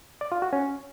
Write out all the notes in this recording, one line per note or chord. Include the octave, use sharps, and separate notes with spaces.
D5
F4
F#4
C#4